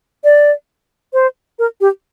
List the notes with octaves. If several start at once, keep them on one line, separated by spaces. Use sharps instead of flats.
D5
C5
A#4
G4